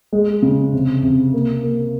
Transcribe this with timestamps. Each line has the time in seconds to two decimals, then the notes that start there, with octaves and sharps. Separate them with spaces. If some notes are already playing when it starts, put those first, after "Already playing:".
0.12 G#3
0.42 C#3
0.73 C3
1.03 C3
1.34 A#3
1.63 A#3